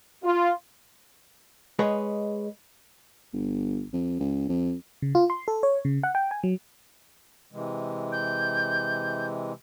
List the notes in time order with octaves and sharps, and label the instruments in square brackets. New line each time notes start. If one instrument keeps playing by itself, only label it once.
[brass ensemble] F4
[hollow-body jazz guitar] G#3 G#4 B4 C#5 D#5
[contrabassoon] G1
F2
C#2
F2
[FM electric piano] C#3
F4
C6
A4
C#5
C#3
F#5
G5
G#5
F#3
[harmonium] C3 E3 G#3
[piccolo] G6